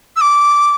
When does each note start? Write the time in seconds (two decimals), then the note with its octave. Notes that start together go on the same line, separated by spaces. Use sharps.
0.16 E6
0.21 D6